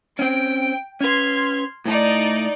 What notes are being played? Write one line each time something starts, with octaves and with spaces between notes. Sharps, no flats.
C4 C#4 G5 D7
C#4 B4 C6 F6 G#6
A2 A3 D#4 D5